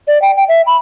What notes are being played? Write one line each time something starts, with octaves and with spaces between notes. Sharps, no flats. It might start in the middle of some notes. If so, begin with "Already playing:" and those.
D5
G5
G5
E5
B5